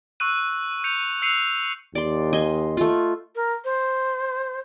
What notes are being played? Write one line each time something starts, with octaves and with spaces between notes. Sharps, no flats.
C#6 E6 F#6 D#7
G6 C#7 D#7 F7
E6 F#6 C7 C#7 D#7 F7
D#2 D5 C6
D#5 G#5 C6
A3 F4
A#4
C5